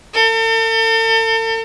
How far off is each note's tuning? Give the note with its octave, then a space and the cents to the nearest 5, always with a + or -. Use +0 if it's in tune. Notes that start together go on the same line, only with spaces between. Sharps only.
A4 +40